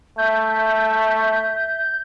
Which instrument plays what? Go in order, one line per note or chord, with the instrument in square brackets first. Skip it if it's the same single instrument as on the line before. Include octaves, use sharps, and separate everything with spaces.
[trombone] A3 [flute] E5 [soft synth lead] G6